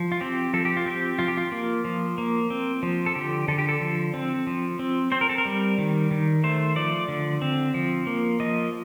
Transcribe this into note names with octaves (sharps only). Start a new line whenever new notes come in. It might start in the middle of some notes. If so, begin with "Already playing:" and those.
Already playing: F3
F4
C4 G4
F3 A4
G4
F4
C4 G4
F3 F4
G4
F4
A#3
F3
A#3
C4
F3
A4
D3 G4
D3 A4
G4
A4
F3
C4
F3
C4
C4 C5
A#4
A4
A#4
G3
D#3
D#3
A3 C5
F3 D5
D3
C4
F3
A#3
F3 D#5